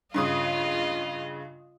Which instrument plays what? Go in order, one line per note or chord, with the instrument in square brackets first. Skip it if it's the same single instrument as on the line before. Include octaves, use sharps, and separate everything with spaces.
[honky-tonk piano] G2 C#3 D#6 [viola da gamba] F4 D#5